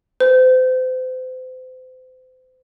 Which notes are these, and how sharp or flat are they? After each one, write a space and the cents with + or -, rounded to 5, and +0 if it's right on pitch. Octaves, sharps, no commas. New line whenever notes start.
C5 -35